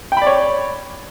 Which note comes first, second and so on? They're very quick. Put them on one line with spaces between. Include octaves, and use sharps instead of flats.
G5 B5 D5 C#5